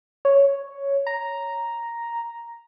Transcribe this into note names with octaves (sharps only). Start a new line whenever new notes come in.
C#5
A#5